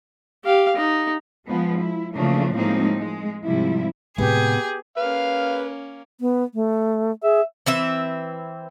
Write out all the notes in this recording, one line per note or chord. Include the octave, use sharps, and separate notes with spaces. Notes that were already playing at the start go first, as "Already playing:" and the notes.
G4 F5
D#4
F3 G#3 B3
E4
C#3 E3 F3 A3 A#3 D4
A2 F3 G#3 A#3 C4 D#4
G#3
G#2 C3 F3 G3 E4
A2 C3 G#3 B3 G4 G#4
A#3 C#4 B4 F5
B3
A3
G#4 E5
E3 C4 E5